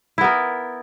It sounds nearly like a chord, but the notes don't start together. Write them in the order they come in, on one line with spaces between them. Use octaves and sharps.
E4 B3 A#4